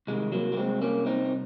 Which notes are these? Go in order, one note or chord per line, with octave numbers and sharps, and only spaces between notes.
C2 C3 D#3 G#3
F#3 A#3
A#3
G#3 C4
A#3 C#4
C4 D#4